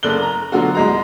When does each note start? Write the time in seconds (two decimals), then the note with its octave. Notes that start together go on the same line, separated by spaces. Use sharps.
0.03 F#1 A4 D5 F#6 G7
0.23 A#5
0.52 B2 D3 F#3 F4 F#4
0.75 C2 G#3 A#5